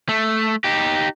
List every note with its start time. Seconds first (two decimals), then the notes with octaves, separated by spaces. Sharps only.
0.09 A3
0.64 D#4 G4